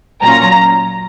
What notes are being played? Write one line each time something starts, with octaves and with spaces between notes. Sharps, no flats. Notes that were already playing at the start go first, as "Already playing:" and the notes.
A#2 F#3 C#4 F4 A#5